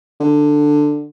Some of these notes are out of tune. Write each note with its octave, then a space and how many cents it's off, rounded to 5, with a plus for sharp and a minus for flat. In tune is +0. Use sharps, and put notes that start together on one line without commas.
D3 +10